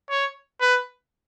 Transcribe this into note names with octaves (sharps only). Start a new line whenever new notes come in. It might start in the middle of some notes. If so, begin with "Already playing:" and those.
C#5
B4